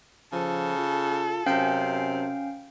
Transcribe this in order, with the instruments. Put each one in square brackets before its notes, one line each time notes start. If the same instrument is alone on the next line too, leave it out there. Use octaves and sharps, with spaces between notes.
[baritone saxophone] C#3 [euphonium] F3 [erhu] A4
[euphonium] F4
[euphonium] F#2 [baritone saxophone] C3 [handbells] C#4 F5 G5